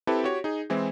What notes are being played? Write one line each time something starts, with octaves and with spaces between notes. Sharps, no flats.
C4 E4 G4 A4 B4
F#4 G4 C#5
D#4 G#4
E3 G#3 C4 E4